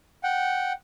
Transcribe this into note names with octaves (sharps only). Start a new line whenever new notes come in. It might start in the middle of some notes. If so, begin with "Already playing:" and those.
F#5 G5